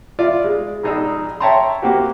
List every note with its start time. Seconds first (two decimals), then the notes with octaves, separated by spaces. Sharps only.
0.19 F4 D5 E5
0.44 G#3
0.83 A#1 G#3 D#4 G#4 D5 E6
1.40 C#5 E5 G5 A5 A#5 C6
1.82 A#3 C4 F#4 G4